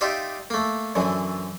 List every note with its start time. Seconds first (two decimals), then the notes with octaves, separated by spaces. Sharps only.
0.01 D#4 F4 G4 D5 E5
0.50 A3 A#3
0.95 F#2 D3 E3 F#3